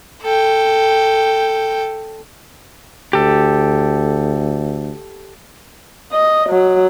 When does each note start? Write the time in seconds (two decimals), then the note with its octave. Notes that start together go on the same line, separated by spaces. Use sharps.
0.22 A4 G5
3.13 D2 G4 A4
6.13 D#5
6.49 F#3